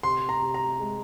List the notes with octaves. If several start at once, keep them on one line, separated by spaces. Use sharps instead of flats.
C3 C6
A#5
C3
A#5
G#3